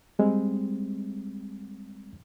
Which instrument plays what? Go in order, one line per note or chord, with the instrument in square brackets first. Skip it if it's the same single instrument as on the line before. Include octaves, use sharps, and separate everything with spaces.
[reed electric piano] G3 G#3 C4